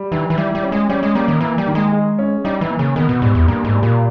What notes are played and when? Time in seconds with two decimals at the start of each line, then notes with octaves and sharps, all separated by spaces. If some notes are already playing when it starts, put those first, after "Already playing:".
Already playing: G3
0.12 D#3 E3
0.30 E3
0.37 G3 E4
0.55 G3
0.63 C#4
0.72 G#3
0.89 G3 C#4
1.03 G#3
1.15 G3 A#3
1.28 D#3
1.41 E3 A#3
1.58 G3
1.67 D#3
1.75 G#3
1.92 G#4
2.19 C#4
2.44 G3 D#4
2.61 E3
2.70 A#3
2.79 C#3
2.96 D#3 B3
3.09 B2
3.22 G#2 G3
3.35 E2
3.48 G2 A#3
3.65 G#2
3.74 G3
3.83 A#2